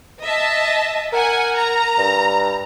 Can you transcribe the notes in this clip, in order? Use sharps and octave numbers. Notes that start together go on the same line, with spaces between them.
D#5 E5 A5
A#4 F#5 G#5
A#5
G2